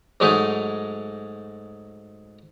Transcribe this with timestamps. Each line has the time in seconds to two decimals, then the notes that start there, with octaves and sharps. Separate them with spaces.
0.20 G#2 F#3 G#3 A3 D#4